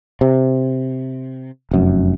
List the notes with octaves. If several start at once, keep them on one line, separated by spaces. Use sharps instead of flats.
C3
F1 F#2